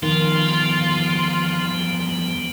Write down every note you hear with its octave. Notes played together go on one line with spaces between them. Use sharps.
E2 D#3 F3 G3 B3 F4